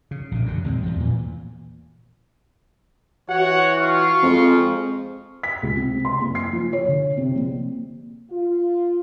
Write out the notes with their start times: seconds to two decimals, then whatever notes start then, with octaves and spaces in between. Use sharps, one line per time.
0.11 C#3
0.31 A#1 C3
0.46 F#2 D3
0.64 A#1 D#2 G#3 C4
0.83 E2 F3
1.00 A#2 E3
3.29 E3 F#4 C#5 F#5
3.79 F4 F5 C#6
4.22 F2 F3 G#3
5.43 B6
5.63 C#2
5.77 C3
6.05 C6
6.21 F#1
6.35 C7
6.53 F3
6.73 C#5
6.88 D3
7.17 C3
7.35 A#1
8.31 F4